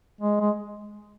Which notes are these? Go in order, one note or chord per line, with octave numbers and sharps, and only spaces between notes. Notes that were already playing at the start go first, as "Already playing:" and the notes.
G#3
G#3